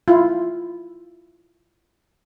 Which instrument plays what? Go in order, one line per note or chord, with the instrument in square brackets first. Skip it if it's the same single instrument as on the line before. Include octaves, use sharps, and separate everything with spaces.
[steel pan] E4 F4